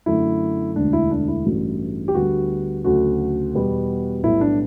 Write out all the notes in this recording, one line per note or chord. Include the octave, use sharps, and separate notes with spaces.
F#2 D3 A3 E4
E1 D2 D3 A3 D4
E4
D4
E4
A1 G2 E3 A3 F#4
G4
D2 D3 G3 B3 F#4
D2 C#3 F#3 A3 F#4
E2 B2 G3 B3
B1 A2 G3 B3 E4
D4